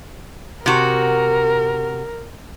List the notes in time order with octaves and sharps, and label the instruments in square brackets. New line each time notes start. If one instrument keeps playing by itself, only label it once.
[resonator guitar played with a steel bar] C3 F#4 [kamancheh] A#4